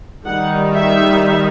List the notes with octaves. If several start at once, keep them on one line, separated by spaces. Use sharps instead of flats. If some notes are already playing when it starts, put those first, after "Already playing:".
D#3 G3 D#4 F#5
E5